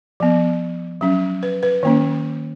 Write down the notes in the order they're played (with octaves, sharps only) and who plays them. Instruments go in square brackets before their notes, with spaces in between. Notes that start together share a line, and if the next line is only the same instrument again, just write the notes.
[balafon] F3 B3
F#3 C#4
B4
B4
D#3 A#3 C#4